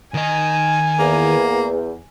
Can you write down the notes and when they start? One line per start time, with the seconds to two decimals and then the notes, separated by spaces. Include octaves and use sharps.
0.14 D#3 D#5 G#5
0.99 E2 A#3